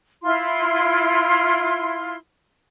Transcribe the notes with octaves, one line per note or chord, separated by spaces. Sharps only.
E4 F4 C6